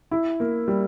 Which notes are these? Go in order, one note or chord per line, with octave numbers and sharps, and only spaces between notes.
E4
A#3
G3